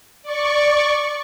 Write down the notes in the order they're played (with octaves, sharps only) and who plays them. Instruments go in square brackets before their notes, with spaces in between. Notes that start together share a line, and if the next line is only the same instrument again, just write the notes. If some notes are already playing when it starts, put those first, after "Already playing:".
[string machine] D5 C#6